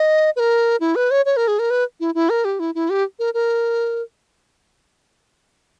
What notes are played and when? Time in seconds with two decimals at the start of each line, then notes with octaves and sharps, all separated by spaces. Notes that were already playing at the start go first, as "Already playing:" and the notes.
Already playing: D#5
0.36 B4
0.40 A#4
0.80 E4
0.96 B4
1.11 C#5
1.26 C#5
1.37 A#4
1.48 G#4
1.59 A#4
1.70 B4
2.00 E4
2.15 E4
2.30 A#4
2.45 G4
2.60 E4
2.75 E4
2.90 G4
3.19 A#4
3.34 A#4